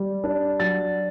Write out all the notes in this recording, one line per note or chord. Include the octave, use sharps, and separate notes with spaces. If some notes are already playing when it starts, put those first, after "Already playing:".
Already playing: G3
D4
F#3 A6